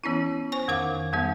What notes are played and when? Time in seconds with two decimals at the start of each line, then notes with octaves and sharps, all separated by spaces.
0.04 E3 B3 C#4 E4
0.52 C5 G#5 C#6
0.68 F2 D#3 A#4 F5 D6
1.13 F2 D#3 G3 B3